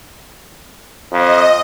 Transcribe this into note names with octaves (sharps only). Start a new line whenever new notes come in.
F2 D#5